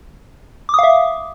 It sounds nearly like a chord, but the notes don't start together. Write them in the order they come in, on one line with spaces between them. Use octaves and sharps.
D6 D#6 F5 E5